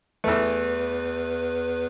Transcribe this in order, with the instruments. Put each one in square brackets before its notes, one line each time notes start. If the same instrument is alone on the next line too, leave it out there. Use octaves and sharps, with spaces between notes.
[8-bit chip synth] E2 B4 [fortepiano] E3 A3